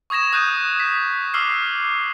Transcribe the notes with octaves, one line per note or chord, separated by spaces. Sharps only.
C#6 D#6 G#6 A#6 E7
D#6 F#6 G6 D#7
B6
D6 E6 F6 C7